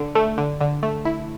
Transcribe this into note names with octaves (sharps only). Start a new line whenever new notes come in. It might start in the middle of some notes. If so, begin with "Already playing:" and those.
Already playing: D3
A3
D3
D3
A3
E4